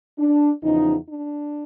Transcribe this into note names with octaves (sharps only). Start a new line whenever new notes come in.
D4
E2 C#3 F3 D#4
D4